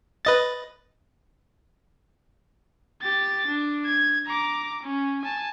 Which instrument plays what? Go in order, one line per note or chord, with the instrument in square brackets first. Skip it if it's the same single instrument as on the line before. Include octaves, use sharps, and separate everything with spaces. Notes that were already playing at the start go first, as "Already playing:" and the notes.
[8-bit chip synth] B4 D#5 A6
[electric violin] G4 A6
D4
G#6
A#5 D6
C#4
G#5 A5